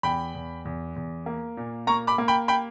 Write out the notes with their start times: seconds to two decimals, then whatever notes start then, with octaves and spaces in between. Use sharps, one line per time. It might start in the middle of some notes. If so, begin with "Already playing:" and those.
0.03 E2 G5 B5
0.35 E2
0.65 E2
0.96 E2
1.26 A#3
1.57 A#2
1.87 A#3 A#5 C#6
2.07 B5 D6
2.18 A#3
2.28 G5 B5
2.48 G5 B5